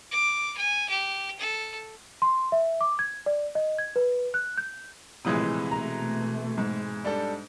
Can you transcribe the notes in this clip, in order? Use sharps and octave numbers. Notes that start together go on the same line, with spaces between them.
D6
G#5
G4
A4
C6
E5
D6
G#6
D5
D#5
G#6
B4
F#6
G6
A#1 A2 C3 E3 G#3 D#6
B2 A3 A#5
G#2
G3 D4 A4